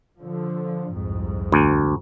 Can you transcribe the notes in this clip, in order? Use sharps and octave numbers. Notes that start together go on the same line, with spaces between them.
D3 F3
C2 F2 G#2
D2